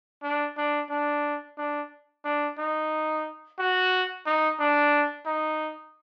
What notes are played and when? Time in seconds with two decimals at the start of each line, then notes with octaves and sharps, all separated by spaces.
0.23 D4
0.57 D4
0.90 D4
1.58 D4
2.25 D4
2.58 D#4
3.59 F#4
4.26 D#4
4.59 D4
5.26 D#4